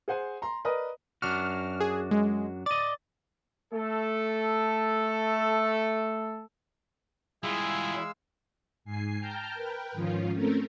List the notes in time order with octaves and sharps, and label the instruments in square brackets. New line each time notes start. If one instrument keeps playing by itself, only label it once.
[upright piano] G#4 C5 F#5 G#5
A#5 C6
A#4 B4 D5 D#5 D#6
[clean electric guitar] F#2 D4 F#4 [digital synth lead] F6
[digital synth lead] G#4
G#3
[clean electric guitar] D5 D#5 [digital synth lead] A6
[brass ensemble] A3 A4
[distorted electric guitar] G3 F4 [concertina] G#3 F5 E6 [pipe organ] E4 [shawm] G#4
[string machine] G#2 G#5 C7
G5 A5 A#5 F6 G6
A#4 B4 G5
G#2 D#3 F3 C#4 F4
A3 C4 C#4 A4 A#4